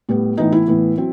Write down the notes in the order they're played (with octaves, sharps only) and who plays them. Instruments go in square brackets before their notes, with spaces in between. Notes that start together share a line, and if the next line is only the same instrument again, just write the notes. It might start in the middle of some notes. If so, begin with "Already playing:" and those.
[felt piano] A2 G3 B3
A2 E3 B3 D#4
E4
A2 E3 B3
F#3 C4